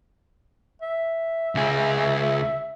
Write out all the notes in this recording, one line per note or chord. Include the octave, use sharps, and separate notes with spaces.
E5
C#2 G#4